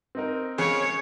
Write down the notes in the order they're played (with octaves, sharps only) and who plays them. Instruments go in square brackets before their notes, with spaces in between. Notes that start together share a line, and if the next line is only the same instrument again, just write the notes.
[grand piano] C4 D#4 A#4
[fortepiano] C#3 [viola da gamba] C#5